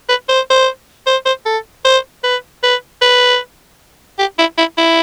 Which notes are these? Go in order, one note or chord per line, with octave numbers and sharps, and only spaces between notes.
B4
C5
C5
C5
C5
A4
C5
B4
B4
B4
G4
E4
E4
E4